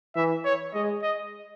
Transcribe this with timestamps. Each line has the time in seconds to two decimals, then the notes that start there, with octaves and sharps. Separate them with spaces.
0.16 E3 E5
0.45 C#5
0.74 G#3 D#5
1.03 D#5